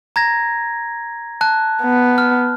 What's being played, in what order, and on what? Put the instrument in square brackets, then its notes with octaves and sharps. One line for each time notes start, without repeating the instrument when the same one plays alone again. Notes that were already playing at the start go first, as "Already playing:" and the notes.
[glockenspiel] A#5 G#6 A#6
A5 F#6
[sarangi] B3
[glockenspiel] F6